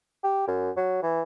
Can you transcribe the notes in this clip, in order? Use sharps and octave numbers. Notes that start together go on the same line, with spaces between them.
G4
F#2
F#3
E3